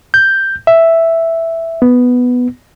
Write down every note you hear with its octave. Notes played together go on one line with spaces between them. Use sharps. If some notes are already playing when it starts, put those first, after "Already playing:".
G6
E5
B3